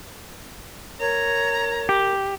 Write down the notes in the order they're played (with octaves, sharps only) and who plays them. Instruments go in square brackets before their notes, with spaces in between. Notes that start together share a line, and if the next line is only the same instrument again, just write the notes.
[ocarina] A#4 [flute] C#5 [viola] A#5
[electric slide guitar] G4